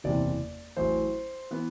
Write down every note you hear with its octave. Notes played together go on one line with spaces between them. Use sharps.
F#1 E2 C3 D5
A1 A2 F#3 C5
E3 B3